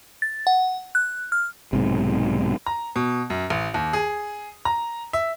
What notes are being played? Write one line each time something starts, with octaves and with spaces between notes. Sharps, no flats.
A6
F#5
F#6
F6
B1 G#2 C3
A#5
B2
F#2
A1
D#2
G#4
A#5
E5